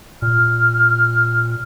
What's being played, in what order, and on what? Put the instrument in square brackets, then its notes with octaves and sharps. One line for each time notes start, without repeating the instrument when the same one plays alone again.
[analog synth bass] A#2 [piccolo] F6